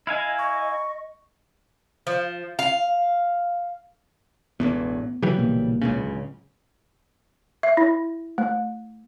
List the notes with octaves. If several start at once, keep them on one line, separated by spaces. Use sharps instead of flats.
E4 D#5 F5 G#5
C#6
F3
F5
E1 A1 E2 B3
C#3 E3 F#3 G3
A#1 B2 A#3
D1 C#2 C#3
E5
E4
A3